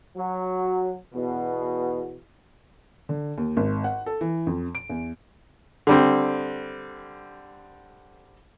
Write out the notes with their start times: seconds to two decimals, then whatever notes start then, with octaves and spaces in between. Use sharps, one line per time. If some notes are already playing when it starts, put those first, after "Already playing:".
0.15 F#3
1.12 E2 B2
3.09 D3
3.38 D#2
3.57 G#1
3.84 F#5
4.06 A4
4.21 E3
4.47 F2
4.75 D7
4.90 E2
5.87 D3 G3 C4